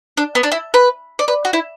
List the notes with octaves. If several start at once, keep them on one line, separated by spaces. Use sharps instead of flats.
D4
B3
D4
E4
B4
D5
B4
F#4
E4